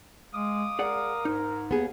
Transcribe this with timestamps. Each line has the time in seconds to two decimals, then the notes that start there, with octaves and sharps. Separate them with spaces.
0.33 G#3 F5 D6 D#6
0.79 G#4 A#4 D5 F#5
1.25 G#2 D#4
1.71 D#2 B3 G#4